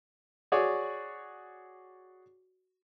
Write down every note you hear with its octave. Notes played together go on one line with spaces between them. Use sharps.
F#4 G#4 C#5 D5